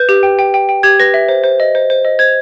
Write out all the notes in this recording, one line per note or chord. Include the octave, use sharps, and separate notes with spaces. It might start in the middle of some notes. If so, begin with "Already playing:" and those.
Already playing: B4 G6
G4
G5
G5
G5
G5
G4 G#6
B4 A#6
E5
C5
C5
D#5
C5
C5
D#5
C5 G#6